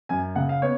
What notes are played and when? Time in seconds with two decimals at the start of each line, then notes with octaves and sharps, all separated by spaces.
0.09 F#2 G#5
0.36 C#3 F#5
0.49 F5
0.62 B3 C#5